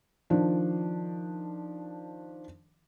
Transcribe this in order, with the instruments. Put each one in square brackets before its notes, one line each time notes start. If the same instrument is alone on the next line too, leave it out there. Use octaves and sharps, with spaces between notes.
[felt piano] D#3 F3 D4